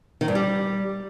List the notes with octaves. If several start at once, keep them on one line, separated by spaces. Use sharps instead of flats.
D#3
G2
G3